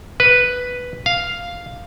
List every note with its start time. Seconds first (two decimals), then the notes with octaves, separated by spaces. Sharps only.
0.20 B4
1.06 F5